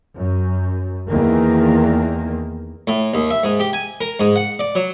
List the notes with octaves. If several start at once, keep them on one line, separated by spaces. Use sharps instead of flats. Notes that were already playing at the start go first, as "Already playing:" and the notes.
F#2
E2 D#3 A#3
A2
D#2
E5
G#2
G4
G#5
A#4
G#2
F#5
D5
F#3